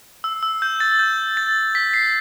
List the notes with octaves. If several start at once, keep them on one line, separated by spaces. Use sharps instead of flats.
E6
E6
G6
A6
G6
A6
B6
C7